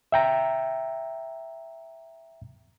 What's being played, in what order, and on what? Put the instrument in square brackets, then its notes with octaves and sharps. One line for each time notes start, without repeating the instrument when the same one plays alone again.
[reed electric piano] E5 G5 A#5